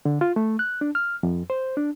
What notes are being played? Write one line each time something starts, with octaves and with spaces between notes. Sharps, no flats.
D3
F4
A3
F#6
D4
F6
F2
C5
D4